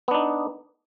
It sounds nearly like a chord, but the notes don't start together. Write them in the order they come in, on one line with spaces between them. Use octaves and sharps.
B3 D4 D#4